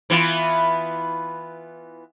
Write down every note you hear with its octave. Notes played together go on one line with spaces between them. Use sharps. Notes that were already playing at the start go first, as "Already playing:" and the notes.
E3 B3 F4